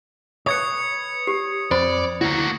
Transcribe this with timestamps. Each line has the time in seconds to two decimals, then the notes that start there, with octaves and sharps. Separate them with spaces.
0.46 B4 C#5 D#6 G#6 C#7
1.27 G4
1.71 F2 C4 C5 D5 B5
2.21 D2 A#3 E4 F#4